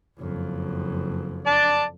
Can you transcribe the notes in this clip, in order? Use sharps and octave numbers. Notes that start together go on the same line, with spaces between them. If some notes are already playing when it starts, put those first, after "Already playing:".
F#1 F2
D5 A5